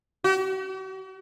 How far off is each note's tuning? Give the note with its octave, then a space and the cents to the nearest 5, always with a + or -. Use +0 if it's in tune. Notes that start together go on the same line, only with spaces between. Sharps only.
F#4 +45